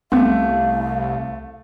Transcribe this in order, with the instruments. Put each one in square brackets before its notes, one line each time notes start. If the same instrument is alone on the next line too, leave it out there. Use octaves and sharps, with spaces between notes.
[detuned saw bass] C2 [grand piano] A3 [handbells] B3 C4 [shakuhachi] F5